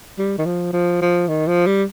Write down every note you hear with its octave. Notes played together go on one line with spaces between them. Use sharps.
G3
D#3
F3
F3
F3
D#3
F3
G3